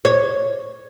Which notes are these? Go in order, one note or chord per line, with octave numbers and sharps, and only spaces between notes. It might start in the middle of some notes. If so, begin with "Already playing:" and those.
C#5